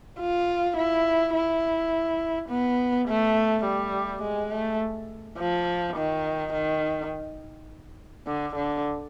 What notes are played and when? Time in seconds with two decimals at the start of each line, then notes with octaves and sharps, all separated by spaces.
0.20 F4
0.77 E4
1.34 E4
2.49 B3
3.08 A3
3.65 G3
4.22 G#3
4.52 A3
5.38 F3
5.96 D#3
6.53 D#3
8.27 D3
8.56 D3